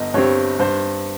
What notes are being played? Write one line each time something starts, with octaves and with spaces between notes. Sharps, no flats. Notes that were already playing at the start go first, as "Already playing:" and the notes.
Already playing: G1 D#5
G2 G3 C4 C#5
G2 C5